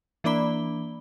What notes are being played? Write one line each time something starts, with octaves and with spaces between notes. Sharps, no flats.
E3 A#3 D4 D5 B5 G7